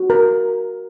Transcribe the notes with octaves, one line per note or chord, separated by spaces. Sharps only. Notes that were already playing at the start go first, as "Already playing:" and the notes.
Already playing: F#4
A#4